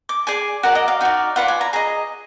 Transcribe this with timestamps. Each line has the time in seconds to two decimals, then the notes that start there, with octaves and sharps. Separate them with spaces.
0.09 D6
0.27 G#4 D5 G#5
0.63 F#4 A#4 D5 F#5
0.75 D#5
0.88 F5
1.01 D#4 F#4 D5
1.36 F4 B4 D5 F#5
1.48 G#5
1.61 A#5
1.73 G#4 D#5 A#5